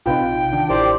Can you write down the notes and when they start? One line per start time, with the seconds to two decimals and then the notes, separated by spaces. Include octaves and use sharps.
0.06 A#1 C3 D#4 F4 B4 G5
0.53 D#3 D4
0.69 A1 E4 G4 A#4 C5 D5